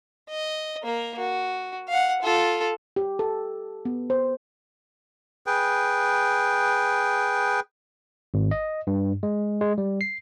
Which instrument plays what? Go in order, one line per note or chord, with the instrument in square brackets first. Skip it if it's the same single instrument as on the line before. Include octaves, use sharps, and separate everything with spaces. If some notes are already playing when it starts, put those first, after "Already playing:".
[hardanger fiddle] D#5
A#3 A#4
F#4
F5 F#5
F4 A4
[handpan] G4
A4
B3
C5
[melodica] G#4 B4 G5
[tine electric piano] G#1
D#5
G2
G#3
G#3
G3
C7